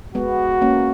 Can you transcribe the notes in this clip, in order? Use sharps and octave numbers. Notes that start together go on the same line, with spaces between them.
G#3 B3 F#4
A#3 C#4